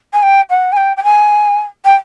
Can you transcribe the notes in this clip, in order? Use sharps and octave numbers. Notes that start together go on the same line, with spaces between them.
G#5
G5
F#5
G#5
G5
G5
G#5
G5